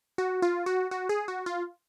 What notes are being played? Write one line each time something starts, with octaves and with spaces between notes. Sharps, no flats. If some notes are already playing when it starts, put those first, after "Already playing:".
F#4
F4
F#4
F#4
G#4
F#4
F4